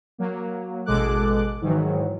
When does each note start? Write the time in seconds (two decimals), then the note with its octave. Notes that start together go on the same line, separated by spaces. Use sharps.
0.18 F#3 A#3
0.86 A1 B2 G#3 A4 D6 F#6
1.61 G#2 D#3 E3 F#3